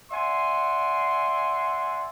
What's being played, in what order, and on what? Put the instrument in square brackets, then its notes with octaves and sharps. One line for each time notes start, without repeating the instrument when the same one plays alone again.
[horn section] D5 E5 F#5 G#5 C6